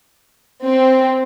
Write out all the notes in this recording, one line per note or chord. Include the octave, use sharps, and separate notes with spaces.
C4